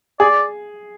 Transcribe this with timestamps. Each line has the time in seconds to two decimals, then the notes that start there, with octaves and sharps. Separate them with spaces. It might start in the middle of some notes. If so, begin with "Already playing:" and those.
0.20 G#4 D5